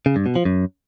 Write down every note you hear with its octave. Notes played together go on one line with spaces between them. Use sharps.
C#3
G2
B2
F3
F#2